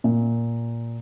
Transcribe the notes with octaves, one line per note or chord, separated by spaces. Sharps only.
A#2